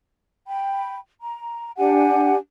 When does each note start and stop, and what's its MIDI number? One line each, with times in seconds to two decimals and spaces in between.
0.48 0.96 79
0.48 0.96 83
1.21 1.71 82
1.77 2.36 62
1.77 2.36 67
1.77 2.36 78
1.77 2.36 80